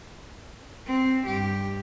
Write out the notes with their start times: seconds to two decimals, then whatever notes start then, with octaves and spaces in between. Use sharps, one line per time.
0.87 C4
1.26 G2 G4